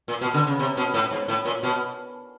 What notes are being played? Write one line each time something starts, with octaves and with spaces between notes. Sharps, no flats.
A#2
B2
D3
C#3
C3
B2
A2
G#2
A2
A#2
B2